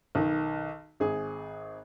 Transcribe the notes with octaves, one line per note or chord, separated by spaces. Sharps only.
B1 D#3
G#1 G#4